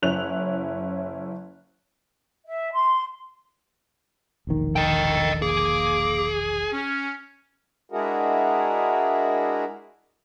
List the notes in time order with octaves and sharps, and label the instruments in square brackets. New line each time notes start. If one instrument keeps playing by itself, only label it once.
[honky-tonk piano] F#1 C#4 E4 F#6 F7
[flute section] E5
C6
[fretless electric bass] E1 A#1 D#3
[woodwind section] A4 [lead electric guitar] D#5 G5
[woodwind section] A#3 D6 [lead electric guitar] G#4
[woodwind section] C#4
[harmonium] G#3 D4 E4 F#4 G#4 A#4